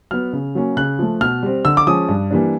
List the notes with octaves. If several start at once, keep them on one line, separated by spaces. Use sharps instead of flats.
F#3 B3 F6
C#3
F#3 A#3 C#4
C#3 F#6
F3 A3
B2 F6
G3 C4
D3 E6
D6
F3 G#3 C#4 D#6
G2
E3 G3 A#3 D4